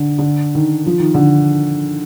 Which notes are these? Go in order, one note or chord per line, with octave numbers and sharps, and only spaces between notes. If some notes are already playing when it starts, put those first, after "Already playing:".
Already playing: D3
D3
D#3
F3
D#3
D3